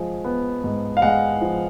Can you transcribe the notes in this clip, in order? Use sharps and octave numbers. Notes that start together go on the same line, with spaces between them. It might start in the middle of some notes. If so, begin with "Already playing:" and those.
Already playing: F3 G#3
B3
G#2
F5
G#3 F#5
F3